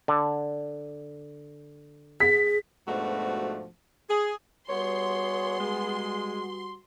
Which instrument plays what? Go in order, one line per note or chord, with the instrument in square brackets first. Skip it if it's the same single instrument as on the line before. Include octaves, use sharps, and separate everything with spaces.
[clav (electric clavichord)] D3
[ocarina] G#4 [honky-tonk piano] B6
[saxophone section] G#2 B2 F3 A3 D4 F#4
G#4
[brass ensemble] G3 F#4 [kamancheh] B3 G#4 [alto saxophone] C#5 [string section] C6
[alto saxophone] G#3